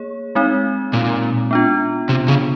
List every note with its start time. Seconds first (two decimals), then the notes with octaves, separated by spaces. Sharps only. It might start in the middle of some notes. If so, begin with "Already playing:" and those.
Already playing: A#3 G#4 C#5
0.35 G#3 C4 D#4
0.93 A#2
1.51 B3 D4 F4
2.09 C3
2.28 C#3